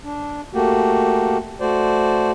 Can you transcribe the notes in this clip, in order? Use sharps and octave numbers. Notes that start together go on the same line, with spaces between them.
D4
A3 A#3 F#4 G4
A3 F#4 C5 D5